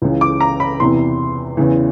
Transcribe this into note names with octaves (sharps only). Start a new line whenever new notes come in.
C#2 C#3 E3
D6
A#5
B5
E2 C3 E3 C6
E2 C#3 E3